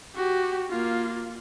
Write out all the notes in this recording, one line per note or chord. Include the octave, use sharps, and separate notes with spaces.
F#4 G4
A#3 F4